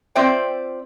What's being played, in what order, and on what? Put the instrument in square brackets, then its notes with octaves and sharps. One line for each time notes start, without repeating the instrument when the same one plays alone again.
[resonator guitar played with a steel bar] C4 F4 C5 D5 E5 G5